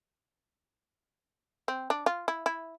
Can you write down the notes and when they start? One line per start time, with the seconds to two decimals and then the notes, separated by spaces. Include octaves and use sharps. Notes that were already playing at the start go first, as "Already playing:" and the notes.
1.68 C4
1.90 D4
2.06 F4
2.28 E4
2.46 E4